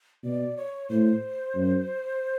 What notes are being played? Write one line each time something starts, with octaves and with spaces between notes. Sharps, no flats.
B2 D5
C#5
A2 C5
F#2